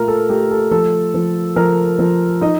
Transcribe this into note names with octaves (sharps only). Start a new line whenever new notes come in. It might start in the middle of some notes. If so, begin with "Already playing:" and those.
Already playing: A#2 A3 F4 A#4
A4
A3 G4
A4
F3 A4
F3
F3 A#4
F3
D#4 D#5